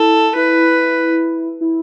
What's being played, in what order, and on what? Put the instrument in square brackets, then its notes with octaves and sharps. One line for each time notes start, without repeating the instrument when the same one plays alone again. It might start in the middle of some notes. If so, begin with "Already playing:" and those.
Already playing: [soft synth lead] E4 [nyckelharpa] A4
[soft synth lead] E4 [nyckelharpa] B4
[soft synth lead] E4